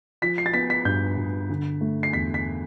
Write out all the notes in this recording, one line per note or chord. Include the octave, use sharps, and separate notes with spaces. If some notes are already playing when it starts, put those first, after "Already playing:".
F3 B6
C7
A6
B3 B6
B6
G2 G6
G2
D3
A3
C7
E2 B6
B6